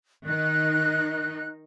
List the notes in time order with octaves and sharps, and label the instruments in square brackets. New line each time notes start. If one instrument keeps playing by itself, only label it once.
[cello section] D#3 D#4 [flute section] F#6